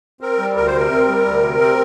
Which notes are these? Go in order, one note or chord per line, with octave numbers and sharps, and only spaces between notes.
C4 A#4
G3
D2 A#4
C5
C3 A#4
C4
G3
D2
C3
C4